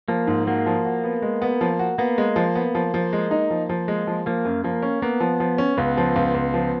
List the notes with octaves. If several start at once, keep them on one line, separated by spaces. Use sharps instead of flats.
F3 A#3
G#2
A#3 F#4
F3
F#4
B3
G#3
B3
F3
F#4
A#3 B3
G#3
F3
B3
F3
F3
G#3
D#4
F3
F3
G#3
F3
F3 A#3
F#2
F3 A#3
C#4
A#3 B3
F3
F3
C#4
C#2 B3
F3
C#2
C#2
F3